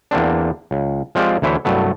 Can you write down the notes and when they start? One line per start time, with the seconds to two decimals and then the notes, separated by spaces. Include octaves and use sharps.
0.11 E2 A#3 C4 D4
0.71 C#2
1.15 F3 G#3 C4 F4 G4 D5
1.42 D2 E3 E4 C5 C#5 E5
1.65 C2 G2 F#3 A3 B3